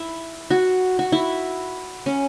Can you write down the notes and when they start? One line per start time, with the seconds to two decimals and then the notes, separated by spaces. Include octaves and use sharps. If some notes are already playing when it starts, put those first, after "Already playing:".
Already playing: E4
0.51 F#4
0.99 F#4
1.12 E4
2.06 C#4